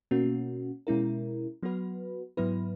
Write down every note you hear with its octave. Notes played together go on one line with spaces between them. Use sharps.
B2 A#3 C#4 F#4
B2 G#3 C#4 E4 A#4
F#3 B3 F#4 B4
G#2 F#3 B3 E4 B4